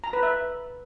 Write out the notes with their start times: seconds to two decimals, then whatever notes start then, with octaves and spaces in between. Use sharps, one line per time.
0.04 A#5
0.13 B4
0.23 E5